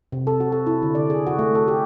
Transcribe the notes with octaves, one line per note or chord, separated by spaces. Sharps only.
C3
A4
F#4
A4
E4
D3
D5
G#4
F#4
A3
A4
G4